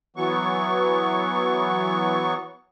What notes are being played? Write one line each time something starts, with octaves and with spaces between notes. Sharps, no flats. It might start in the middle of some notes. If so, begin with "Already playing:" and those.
E3 F#3 B3 C#6